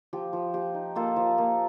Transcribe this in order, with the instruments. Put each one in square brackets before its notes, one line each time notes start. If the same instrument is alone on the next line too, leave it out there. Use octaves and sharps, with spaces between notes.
[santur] F3 G4
F3
F3 G4
D#4
A#3 F4 A4
F3
A#3